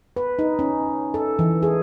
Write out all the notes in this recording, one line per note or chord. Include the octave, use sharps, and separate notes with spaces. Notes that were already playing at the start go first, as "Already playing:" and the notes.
B4
D#4
C#4
A4
E3
G#4